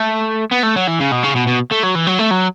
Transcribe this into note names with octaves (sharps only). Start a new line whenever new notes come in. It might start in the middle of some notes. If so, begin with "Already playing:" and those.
Already playing: A3
B3
A3
F#3
E3
C#3
B2
C#3
B2
B2
A3
F#3
E3
F#3
A3
F#3